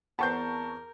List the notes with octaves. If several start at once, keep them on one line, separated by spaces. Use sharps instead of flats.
E2 B3 C4 A#4 A5 C6 C#6 G6